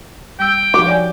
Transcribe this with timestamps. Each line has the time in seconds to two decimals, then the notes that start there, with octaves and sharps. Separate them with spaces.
0.40 G3 G5 E6
0.74 F3 D#4 F#4 D6
0.86 C#5 D5 G#5